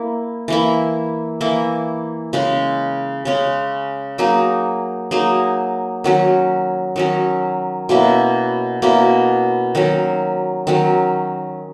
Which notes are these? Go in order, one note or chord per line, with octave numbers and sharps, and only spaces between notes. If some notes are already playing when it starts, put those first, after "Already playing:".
Already playing: A#3 E4
E3 A#3 E4
E3 A#3 E4
C#3 G#3 C#4
C#3 G#3 C#4
F#3 A#3 D#4 G#4
F#3 A#3 D#4 G#4
D#3 F#3 C#4
D#3 F#3 C#4
B2 A#3 C#4 E4
B2 A#3 C#4 E4
D#3 F#3 C#4
D#3 F#3 C#4